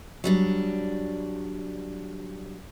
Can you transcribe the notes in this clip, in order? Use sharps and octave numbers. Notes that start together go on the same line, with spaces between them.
F#3 G3 D4